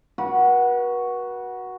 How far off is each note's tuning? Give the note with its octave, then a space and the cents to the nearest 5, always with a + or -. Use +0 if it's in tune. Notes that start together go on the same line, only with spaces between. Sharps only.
F#4 +0 B4 -40